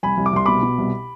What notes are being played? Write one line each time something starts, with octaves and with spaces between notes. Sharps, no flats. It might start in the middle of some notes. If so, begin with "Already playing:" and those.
C2 G#5 B5
C2
D6
C2 C6
B2 B5 D6
B2
C2